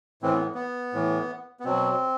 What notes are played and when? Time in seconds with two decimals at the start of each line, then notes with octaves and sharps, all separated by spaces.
0.22 A2 E3 C4
0.33 B3
0.55 B3
0.93 A2 E3
1.60 B3
1.65 B2 F#3 C4